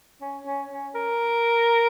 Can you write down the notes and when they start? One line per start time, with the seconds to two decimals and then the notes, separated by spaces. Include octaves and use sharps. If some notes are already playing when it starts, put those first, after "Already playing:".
0.21 C#4
0.46 C#4
0.71 C#4
0.95 A#4